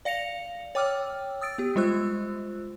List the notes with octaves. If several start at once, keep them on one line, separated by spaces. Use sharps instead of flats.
D5 F5 A#6 C#7 F7
C#5 G5 D6 E6 F6
D#6 E6 A6 D7
B3 G4
G3 G#3 F4 C5 E6 F#6